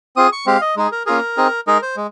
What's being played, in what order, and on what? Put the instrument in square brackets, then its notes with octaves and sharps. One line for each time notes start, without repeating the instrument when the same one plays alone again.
[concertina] C4 F4 G#4 D#6
C#6
G#3 C4 G4 F5
D#5
G#3 D#4 G#4
A#4
A#3 C#4 F4 G#4 A#4
C4 D#4 G#4
G#3 D#4 G#4 A#4
C5
G#3